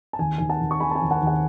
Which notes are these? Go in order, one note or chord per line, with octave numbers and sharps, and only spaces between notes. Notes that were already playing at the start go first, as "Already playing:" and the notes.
A5
D#2 G#5
D#2 G#5
F#5 A5
D#2
C#6
D#3 G#5 B5
A5
G#5 B5
D#2
F#5 A5
D#2
F#5